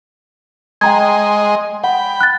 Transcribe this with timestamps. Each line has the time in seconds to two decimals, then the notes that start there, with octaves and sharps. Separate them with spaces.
0.81 G#3 D#5 G5 A#5 C6 G#6
1.84 F#5 G5 B5
2.21 F#6 A6